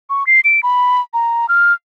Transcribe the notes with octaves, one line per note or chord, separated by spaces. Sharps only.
C#6
C7
D7
B5
A#5
F6